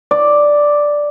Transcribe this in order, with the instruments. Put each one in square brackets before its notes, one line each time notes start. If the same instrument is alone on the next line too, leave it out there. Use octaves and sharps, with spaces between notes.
[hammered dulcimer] D5